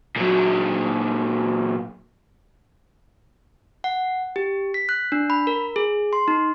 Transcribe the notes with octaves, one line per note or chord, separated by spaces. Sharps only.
A#2 F#3
F#5
G4
B6
F#6
D4
B5
A#4
G#4
C6
D#4